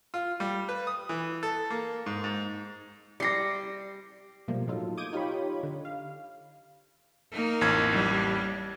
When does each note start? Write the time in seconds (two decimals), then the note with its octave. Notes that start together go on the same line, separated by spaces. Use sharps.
0.14 F4
0.40 G3
0.69 B4
0.87 D#6
1.09 E3
1.43 A4
1.70 A#3
2.06 G#2
2.24 G#2
3.20 G3 G4 A#6 C7 C#7
4.48 B2 F3 G3 A3 A#3
4.67 A2 F#3 D#4 F4 A4
4.97 D6 D#6 G6 G#6 D#7
5.13 D#4 F4 G4 C#5 B5
5.63 D3
5.85 F5
7.32 A#3 D#4
7.61 A1 F2 G#6
7.91 G3